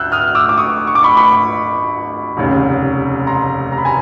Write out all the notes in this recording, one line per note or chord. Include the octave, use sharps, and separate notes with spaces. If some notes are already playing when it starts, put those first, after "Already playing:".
Already playing: D2 E6 F#6 G6
D#6 F6
D6 E6
D6
C#6 D#6
C#6
D6
B5 C#6
B5 C#6
F1 D#2 C#3
A#5 C6
A#5
B5
G#5 A#5